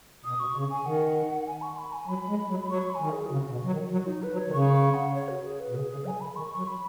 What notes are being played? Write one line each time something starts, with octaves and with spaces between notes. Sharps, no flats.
B2 D#6
B2 C#6
C#3
G#5
D#3 F#5
G#5
C#6
B5
G#5
F#3 B5
G#3
F#3
F#3 C#6
B5
G#5
D#3
G#4
D#4
C#3 F#4
B2
F#3
D#3
F#3 F#4
D#4
B4
F#3
C#5
D#3
C#3 C#6
C#6
F#5
C#5
F#4
G#4
B4
B2
C#3 G#4
C#3 G#4
F#3 G#5
B5
D#3 C#6
C#6
F#3
B5